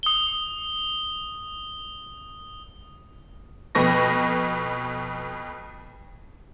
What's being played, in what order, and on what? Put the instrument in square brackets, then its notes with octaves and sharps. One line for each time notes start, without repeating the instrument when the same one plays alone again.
[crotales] D#6 G7
[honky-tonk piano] F2 B2 B4 C#6 A#6